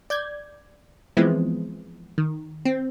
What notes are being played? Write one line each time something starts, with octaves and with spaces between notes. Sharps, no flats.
D5 G6 G#6
E3 F3 G#3 B3 C4 E4
D#3
C4